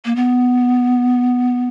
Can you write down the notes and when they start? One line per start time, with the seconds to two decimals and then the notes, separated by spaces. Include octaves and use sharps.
0.05 A#3
0.16 B3